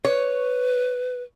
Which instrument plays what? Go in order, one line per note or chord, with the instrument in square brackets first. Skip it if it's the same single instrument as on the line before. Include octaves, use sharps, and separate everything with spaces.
[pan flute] B4 [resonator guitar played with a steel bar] C#5